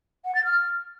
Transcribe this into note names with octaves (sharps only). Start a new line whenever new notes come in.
F#5
A6
F6